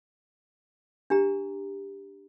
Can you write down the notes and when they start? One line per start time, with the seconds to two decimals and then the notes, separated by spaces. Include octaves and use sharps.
1.10 D4 G4 A#5